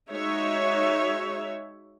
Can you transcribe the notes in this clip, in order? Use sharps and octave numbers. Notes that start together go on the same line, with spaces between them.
G#3 D#4 F#4 C#5 E5